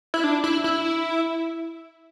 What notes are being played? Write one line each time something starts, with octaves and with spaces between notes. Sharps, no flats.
E4
D4
E4
E4